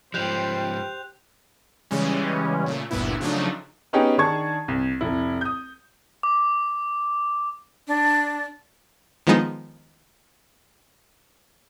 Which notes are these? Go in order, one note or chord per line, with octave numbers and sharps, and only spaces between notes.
G#2 F3 G3 C5 F#6 G6 F7
C#3 E3 G3 G#3 C#4
A#2 C#3 A3
G1 D2 G2 A#2 B3 E4
C#3 F3 F#3 A3 D4 D#4
B3 C#4 D#4 G4 G#4
D#3 D4 G#4 A5 C#6 G#6
C2
F1 E4
D#6 G6
D6
D4
D#3 F3 G#3 B3 D#4 G#4